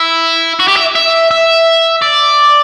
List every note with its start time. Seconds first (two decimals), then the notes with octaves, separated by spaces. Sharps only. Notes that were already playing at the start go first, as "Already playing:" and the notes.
Already playing: E4
0.60 F#4
0.68 G4
0.77 E5
0.96 E5
1.31 E5
2.02 D5